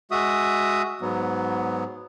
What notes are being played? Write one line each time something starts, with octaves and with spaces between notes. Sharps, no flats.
G#3 F#4 E5 D#6
G#2 F#3 B3